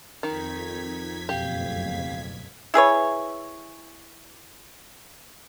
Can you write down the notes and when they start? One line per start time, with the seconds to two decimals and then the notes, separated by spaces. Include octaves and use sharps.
0.23 F2 D#3 D#4 G#6 B6
1.29 F#1 D2 B2 G4 F5
2.74 E4 G#4 B4 C#5